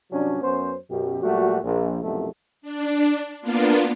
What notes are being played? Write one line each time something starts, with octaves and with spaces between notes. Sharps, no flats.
G2 C3 F#3 C#4 D4
F#2 B3 C#4 C5
F#2 B2 G4
A#2 F#3 G3 A3 F#4
A#1
C2 F#2 B2 F3 G3 A3
D4
A#3 B3 D4 F4